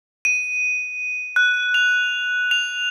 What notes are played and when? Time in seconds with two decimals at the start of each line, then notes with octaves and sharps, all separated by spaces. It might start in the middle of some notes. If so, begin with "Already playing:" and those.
0.25 D#7
1.36 F#6
1.74 F7
2.51 F7